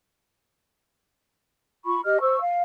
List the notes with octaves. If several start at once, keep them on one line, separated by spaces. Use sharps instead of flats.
F4 B5 C#6
G4 D#5 F6
C5 C#6 E6
F5